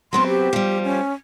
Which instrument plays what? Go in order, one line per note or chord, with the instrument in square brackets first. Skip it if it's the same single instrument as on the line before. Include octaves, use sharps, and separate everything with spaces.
[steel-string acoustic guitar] F#3 B3 C4 [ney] C6
[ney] G4
[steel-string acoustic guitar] F3 G3
[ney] C#4